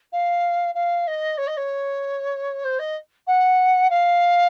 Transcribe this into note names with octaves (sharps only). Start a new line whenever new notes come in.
F5
F5
D#5
C#5
D#5
C#5
C5
D#5
F#5
F5